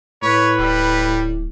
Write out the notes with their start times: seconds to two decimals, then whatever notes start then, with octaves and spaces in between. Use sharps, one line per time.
0.22 A2 B4 C#5
0.58 D1 G3